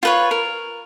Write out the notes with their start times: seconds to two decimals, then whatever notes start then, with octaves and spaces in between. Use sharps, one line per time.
0.03 F4 B4 C#5
0.31 A#4